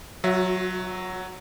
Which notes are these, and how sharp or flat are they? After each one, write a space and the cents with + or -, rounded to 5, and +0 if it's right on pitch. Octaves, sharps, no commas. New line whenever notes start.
F#3 +0 F#4 -40 E5 +0